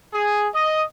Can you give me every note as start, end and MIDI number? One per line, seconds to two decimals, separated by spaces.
0.14 0.48 68
0.55 0.84 75